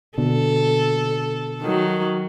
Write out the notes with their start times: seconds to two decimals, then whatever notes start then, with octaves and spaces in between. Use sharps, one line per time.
0.18 B2 D3 A4
1.62 D#3 F#3